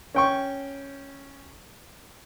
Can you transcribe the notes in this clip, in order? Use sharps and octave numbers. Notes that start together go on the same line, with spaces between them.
C#4 G5 C#6